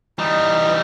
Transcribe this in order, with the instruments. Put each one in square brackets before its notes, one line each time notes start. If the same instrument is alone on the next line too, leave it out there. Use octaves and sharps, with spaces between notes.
[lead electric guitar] E3 G3 [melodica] D#4